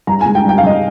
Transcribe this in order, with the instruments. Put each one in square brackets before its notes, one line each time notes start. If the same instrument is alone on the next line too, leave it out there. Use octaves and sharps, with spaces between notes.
[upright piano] G2 A#5
G#5
G#3
G5
G2 G5
F5
G2 D#5